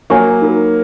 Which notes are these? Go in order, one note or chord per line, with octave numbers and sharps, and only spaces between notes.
F#3 A#3 C#5 G#5 C#6
D#4 F#4 A#4